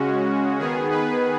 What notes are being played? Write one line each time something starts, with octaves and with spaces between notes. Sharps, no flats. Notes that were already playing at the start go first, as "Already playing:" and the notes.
Already playing: C#3 G#3 C#4 F#4
D#3 B3 G#4
B4